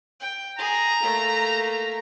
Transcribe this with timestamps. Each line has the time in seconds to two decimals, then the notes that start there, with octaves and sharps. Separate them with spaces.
0.20 G5
0.59 G#4 A#5
1.02 A3 A#3